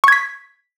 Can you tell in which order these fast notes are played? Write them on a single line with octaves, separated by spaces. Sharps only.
C#6 G#6 B6